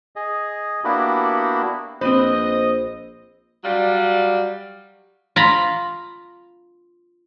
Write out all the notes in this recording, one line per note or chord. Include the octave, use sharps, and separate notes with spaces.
G#4 D#5
A#3 B3 D4 E4 F#4 G4
A#1 C4 B4 C5 D#5
F#3 G3 D5 F5
F4 A#5 B5